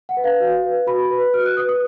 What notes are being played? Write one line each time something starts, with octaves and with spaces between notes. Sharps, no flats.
F#5
B4
F5
F#4
B4
F#4 B5
B4
F#4 F6
F#6
B4 D#6
D#6